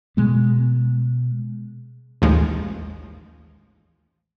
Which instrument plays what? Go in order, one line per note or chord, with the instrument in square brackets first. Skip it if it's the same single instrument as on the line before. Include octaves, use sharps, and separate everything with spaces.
[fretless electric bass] B2 G#3 B3
[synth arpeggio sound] A1 D#2 F3 G#3